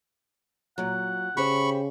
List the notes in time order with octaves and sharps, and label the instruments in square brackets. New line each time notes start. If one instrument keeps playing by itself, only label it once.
[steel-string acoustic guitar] A#2 F#3 [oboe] F#5
[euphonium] C#3 [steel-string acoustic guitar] G4 C5 G5 [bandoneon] B5 C#6